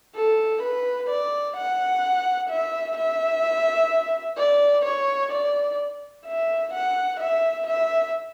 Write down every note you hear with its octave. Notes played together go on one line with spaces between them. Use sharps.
A4
B4
D5
F#5
E5
E5
D5
C#5
D5
E5
F#5
E5
E5